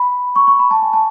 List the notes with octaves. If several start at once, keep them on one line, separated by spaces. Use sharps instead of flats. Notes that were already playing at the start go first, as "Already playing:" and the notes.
Already playing: B5
C#6
C#6
B5
A5
G#5
A5